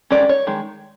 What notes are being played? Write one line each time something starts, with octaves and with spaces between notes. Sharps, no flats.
D#3 G#3 C#4 D5
C#5
D#3 G#3